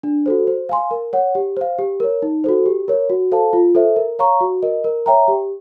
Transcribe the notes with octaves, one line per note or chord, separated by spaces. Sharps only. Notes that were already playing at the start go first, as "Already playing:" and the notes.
D4
F#4 A4 C5
C5
F5 G#5 C6
A#4
C#5 F#5
G4
C5 F5
G4
A#4 C#5
D#4
F#4 A4 C5
G4
A#4 C#5
F#4
A4 C5 F5 A5
F4
A4 C5 E5
A#4
C#5 F5 A#5 C#6
F#4
A#4 D#5
A#4
C#5 E5 G5 A#5
G4